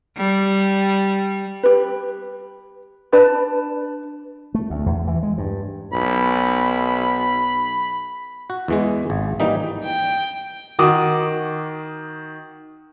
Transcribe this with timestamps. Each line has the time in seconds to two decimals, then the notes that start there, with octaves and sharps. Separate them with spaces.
0.17 G3
1.63 G4 B4
3.12 D4 B4 D5 A5
4.54 A3
4.70 D2
4.86 E2
5.08 E3
5.23 G#3
5.38 G2
5.93 B1 B5
8.50 F#4
8.68 E2 E3 G#3
9.10 G#1
9.40 E3 G3 A#3 D#4
9.84 G5
10.79 D#3 F#4 D6 D#6